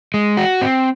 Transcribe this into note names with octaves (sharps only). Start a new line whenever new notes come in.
G#3
F#4
C4